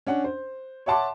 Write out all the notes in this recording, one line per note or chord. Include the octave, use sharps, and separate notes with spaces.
C#4 D4 F#5
C5
C#5 E5 F#5 A5 C6 D6